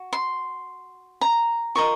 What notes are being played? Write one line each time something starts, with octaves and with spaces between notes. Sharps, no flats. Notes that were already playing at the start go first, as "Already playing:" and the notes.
Already playing: F#4
C6
A#5
F4 A#4 D#5 C#6